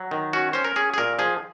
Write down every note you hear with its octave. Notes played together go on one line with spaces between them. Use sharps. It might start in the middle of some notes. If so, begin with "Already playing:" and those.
Already playing: F#3
D#3
C#4 F#4
C#4 C5
A#4
C#4 G#4
G#4
A#2 A#4
F3 G#4